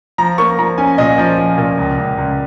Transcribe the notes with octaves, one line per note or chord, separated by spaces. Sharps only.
F3 A#5
A#3 C#6
F3 A#5
C#4 G#5
A#2 D#5
F3
F3
A#2
C#2
C#2
C#2